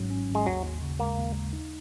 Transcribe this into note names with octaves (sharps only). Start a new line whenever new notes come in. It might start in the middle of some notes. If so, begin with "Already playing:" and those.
Already playing: G#1 G#2 F#3 C#4
C#4
G#1
G#3
D#2 F#3
D#2
C#3
G#3 A#3
D#2
D#2
D#4